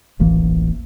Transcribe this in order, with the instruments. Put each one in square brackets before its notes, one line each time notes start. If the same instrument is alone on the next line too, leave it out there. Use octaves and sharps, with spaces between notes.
[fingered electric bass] D#1 A1 E3 A#3